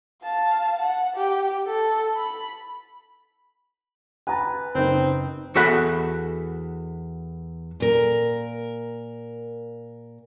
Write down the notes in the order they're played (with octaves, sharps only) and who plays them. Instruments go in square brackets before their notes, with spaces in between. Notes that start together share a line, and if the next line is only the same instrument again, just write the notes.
[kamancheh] F5 A5
F#5
G4
A4
B5
[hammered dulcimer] B4 [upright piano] G#5 A#5 A6
[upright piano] F#1 D#4 [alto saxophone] C4
[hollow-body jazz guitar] E2 F#4 A4 E5 F#5 B5
[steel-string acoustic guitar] A#2 A#4